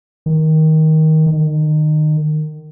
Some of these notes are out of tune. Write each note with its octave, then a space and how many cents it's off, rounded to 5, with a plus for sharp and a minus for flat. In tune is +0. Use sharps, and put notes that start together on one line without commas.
D#3 +15
D#3 -25